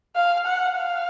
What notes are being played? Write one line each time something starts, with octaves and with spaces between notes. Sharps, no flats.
F5
F#5
F5